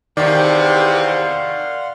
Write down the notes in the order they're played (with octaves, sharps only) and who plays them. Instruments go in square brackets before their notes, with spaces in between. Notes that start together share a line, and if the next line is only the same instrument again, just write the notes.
[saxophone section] E2 C3 [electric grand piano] D#3 [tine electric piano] D5 [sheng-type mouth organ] F5 F#5 C6